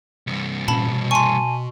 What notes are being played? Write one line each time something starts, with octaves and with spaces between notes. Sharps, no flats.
C2 G2
A#2 C#4 A5 B5
B2
G#5 A5 C6 C#6 D#7